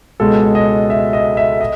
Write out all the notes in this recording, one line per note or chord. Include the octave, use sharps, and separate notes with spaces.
C#2 B2 G#3 A4
D#5
E5
D#5
E5
D#5